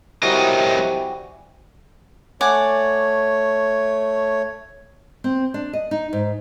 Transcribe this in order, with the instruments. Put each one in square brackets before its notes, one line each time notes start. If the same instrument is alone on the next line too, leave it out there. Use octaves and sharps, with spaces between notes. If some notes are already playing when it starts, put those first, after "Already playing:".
[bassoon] C3 [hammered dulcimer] E3 G3 F#4 [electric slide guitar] F#3 A#4 D#5
[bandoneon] A3 C#5 [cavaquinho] D5 F#5 G#5
[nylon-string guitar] C4
D4
D#5
D#4
G#2